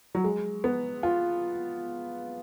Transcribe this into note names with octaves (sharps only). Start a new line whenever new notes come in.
F#3
G#3
B3
F4